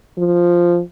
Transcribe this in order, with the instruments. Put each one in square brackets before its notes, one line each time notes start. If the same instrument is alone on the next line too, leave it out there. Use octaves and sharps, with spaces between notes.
[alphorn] F3